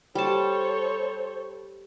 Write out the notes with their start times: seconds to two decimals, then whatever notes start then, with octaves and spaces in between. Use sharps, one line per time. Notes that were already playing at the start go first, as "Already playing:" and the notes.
0.15 G3 A4 C5 C#5 A5